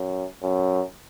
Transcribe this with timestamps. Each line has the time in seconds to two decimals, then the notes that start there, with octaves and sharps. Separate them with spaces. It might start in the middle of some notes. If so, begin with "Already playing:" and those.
Already playing: F#2
0.43 F#2